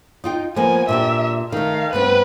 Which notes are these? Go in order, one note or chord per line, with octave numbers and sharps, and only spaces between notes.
D#4 F4 G5
F3 A#3 B3 G#5
A#2 D4 G4 E5
D#3 A3 F5
G2 B3 C4 B4